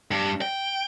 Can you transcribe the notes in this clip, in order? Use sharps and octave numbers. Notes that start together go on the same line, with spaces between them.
G2
G5